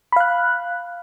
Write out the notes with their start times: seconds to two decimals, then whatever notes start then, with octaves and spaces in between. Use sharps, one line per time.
0.12 B5
0.16 F5
0.20 F#6